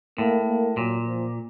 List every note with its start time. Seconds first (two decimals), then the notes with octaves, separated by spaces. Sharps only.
0.18 A2 A#3
0.48 A#3
0.77 A#2 F#3
1.05 F3